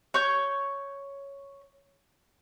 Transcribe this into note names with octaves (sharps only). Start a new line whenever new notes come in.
C#5 C#6 G6